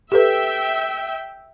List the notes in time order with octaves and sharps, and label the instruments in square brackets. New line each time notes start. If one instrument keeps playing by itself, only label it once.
[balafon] G4 A4 B4 [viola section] E5 G5